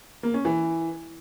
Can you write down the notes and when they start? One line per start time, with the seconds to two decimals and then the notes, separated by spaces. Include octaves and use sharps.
0.23 A#3
0.34 C#4
0.45 E3